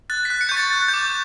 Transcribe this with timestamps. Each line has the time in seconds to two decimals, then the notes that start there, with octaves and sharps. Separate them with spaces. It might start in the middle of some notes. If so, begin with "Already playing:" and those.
0.10 F#6 A6
0.25 B6
0.30 F#6
0.41 C#7
0.49 C#6 G6
0.57 A6
0.73 F#6
0.88 G6
0.94 D6
1.04 G6